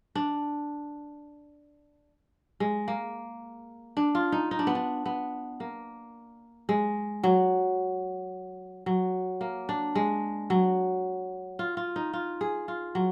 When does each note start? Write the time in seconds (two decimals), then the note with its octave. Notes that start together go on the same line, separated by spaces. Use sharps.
0.15 D4
2.60 G#3
2.88 A#3
3.97 D4
4.15 F4
4.32 D#4
4.51 D#4
4.59 D4
4.67 B3
4.75 D4
5.06 B3
5.60 A#3
6.69 G#3
7.23 F#3
8.86 F#3
9.41 A#3
9.69 D4
9.95 G#3
10.50 F#3
11.59 F4
11.77 F4
11.96 D#4
12.13 F4
12.41 G#4
12.68 F4
12.95 F#3